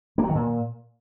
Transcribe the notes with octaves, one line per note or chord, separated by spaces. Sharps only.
A#3
F#3
D#3
A#2